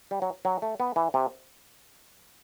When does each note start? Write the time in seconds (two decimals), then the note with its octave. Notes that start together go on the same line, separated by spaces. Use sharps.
0.11 G3
0.22 F#3
0.45 F#3
0.62 A3
0.80 B3
0.96 E3
1.14 C3